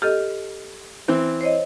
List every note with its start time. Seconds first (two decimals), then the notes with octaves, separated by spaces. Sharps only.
0.02 G4 A4 D#5 F6
1.08 E3 C4
1.41 C5 C#5 D#5